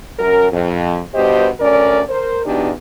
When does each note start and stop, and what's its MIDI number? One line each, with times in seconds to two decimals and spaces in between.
0.19 0.47 42
0.19 0.47 70
0.52 1.01 41
1.15 1.49 43
1.15 1.49 47
1.15 1.49 67
1.15 1.49 72
1.15 1.49 75
1.60 2.02 38
1.60 2.02 61
1.60 2.02 70
1.60 2.02 74
2.10 2.42 70
2.10 2.42 72
2.46 2.71 40
2.46 2.71 47
2.46 2.71 62
2.46 2.71 63
2.46 2.71 67